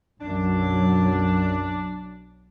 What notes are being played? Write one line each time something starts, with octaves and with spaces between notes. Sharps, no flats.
B1 F#2 F#3 D4